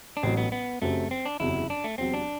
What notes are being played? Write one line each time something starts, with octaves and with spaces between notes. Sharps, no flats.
D4
A1 A2 F#3 C4
B3
B3
F#1 F#2 F#3 A3 C4 G4
C4
D4
F#1 E2 C3 F#3 E4
D4
A3
E2 C3 F#3 C4
D4